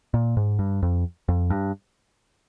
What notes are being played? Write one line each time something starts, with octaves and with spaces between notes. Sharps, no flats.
A#2
G#2
G2
F2
F2
G2